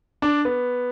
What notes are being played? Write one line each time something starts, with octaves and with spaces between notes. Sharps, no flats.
D4
B3